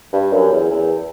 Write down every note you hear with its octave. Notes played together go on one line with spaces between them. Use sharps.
G2
F#2
E2
E2